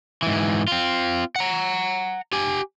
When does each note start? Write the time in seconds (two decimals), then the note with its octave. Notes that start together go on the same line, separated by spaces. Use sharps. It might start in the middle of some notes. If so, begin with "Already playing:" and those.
0.23 G#2 E3
0.68 C4 F4
1.36 F#5 A#5
2.33 G4 G#5